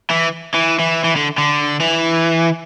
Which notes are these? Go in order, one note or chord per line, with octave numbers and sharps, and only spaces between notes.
E3
E3
E3
E3
D3
D3
E3